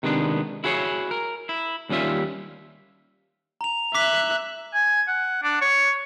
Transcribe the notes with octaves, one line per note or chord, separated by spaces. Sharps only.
C3 D#3 G#3 B3 C#4 D4
E4 F#4 G#4 C5 C#5
A#4
E4
D#2 G3 C#4 F4 E5
A#5 F7
E5 D6 F#6 B6
G#5
F#5
D4
C#5